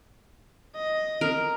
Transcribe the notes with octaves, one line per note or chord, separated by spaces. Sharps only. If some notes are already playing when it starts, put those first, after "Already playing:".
D#5
A#4